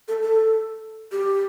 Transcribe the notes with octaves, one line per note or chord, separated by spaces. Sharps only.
A4
A4
G4